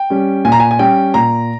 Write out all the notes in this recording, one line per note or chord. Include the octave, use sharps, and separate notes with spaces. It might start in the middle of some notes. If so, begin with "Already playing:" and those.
Already playing: G5
G3 C#4
A#2 G#5
A#5
G#5
G#5
G3 C#4 G5
A#2 A#5